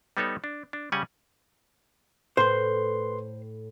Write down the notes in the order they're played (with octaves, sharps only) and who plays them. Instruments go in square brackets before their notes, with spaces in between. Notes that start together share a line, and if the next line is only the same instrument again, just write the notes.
[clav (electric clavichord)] G3 B3 D#4 A4 C#5
D4
D4
C#3 G3 C#4 F#5 G#5
[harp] A2 [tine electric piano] B4 C6 [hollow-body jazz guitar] C5